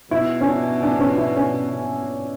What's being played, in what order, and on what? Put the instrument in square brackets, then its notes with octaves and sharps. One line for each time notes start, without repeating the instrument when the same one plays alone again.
[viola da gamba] B2 [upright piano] E4
[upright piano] C#4
D4
D4
B3
C#4
D4
E4
C#4